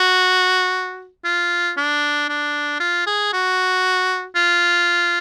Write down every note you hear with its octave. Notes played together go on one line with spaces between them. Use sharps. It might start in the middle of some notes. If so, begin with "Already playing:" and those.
Already playing: F#4
F4
D4
D4
F4
G#4
F#4
F4